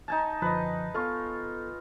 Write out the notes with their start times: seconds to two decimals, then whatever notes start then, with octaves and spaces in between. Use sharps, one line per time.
0.08 D#4 G#5 A5
0.42 F#2 D3 F3 B4 D#5
0.94 B3 F4 A4 C#6